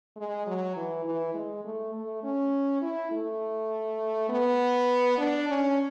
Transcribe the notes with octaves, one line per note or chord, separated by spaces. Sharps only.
G#3
F#3
E3
E3
G#3
A3
A3
C#4
E4
A3
B3
D4
C#4